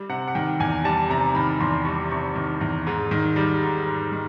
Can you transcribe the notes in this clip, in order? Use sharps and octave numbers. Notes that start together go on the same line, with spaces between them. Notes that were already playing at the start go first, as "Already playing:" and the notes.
Already playing: G3
C3 F#5
F#5
D#3 G5
E2 G#5
G3 A5
C3 A#5
D#3 B5
E2 C6
G3 C#6
C3 C#6
D#3
E2
G#2
D#3
G3
G#2
G#2
D#3